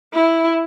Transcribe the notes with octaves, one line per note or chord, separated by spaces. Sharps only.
E4